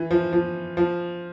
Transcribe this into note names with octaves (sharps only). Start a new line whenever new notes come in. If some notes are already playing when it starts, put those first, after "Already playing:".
Already playing: E3
F3
F3
F3